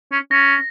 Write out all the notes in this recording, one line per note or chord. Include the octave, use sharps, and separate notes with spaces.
C#4
C#4 A#6